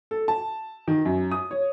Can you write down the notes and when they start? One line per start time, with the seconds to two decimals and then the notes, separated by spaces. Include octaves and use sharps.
0.11 A4
0.28 A5
0.88 D#3
1.05 F#2
1.31 D#6
1.51 C#5